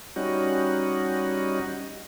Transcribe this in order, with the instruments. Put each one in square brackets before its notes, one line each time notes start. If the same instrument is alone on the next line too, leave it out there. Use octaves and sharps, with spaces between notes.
[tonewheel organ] G3 C#4 D#4 F#4